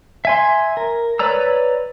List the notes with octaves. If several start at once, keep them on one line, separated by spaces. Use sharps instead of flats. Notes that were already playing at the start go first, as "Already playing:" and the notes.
E5 G#5 C6
A#4
B4 C#5 D5 A#5 E6